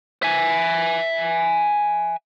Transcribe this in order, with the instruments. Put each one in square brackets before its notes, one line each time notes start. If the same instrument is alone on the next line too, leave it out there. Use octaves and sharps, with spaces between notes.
[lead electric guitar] E5 G#5